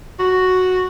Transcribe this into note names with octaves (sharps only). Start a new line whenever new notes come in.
F#4